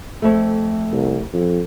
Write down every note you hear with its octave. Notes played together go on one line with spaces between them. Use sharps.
F2 A3
C2
F2